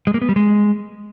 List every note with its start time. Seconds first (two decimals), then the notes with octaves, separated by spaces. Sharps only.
0.07 G#3
0.14 A#3
0.22 B3
0.29 G3
0.36 G#3